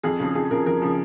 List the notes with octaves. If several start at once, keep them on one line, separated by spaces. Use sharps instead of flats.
F2 G#4
C#3 F3
F2 G#4
C#3 F3 A#4
F2 A#4
C#3 F3